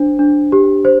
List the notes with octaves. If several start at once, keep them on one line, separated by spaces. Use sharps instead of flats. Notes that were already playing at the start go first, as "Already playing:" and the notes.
Already playing: D4 C5
D4
G4
C5